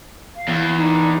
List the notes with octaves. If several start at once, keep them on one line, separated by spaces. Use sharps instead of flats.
F5
E2
D4 D#4